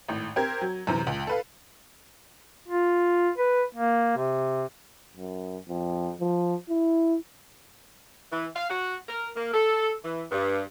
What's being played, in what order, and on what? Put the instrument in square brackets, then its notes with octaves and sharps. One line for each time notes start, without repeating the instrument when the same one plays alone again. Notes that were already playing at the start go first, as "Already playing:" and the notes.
[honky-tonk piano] G#1 A2
C4 G4 A#4 G#6
F#3
F#2 C3 E3
C#2
A4 B4 F5
[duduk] F4
B4
A#3
C3
[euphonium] F#2
F2
F3
E4
[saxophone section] E3
F5
F#4
A#4
A#3
A4
E3
G2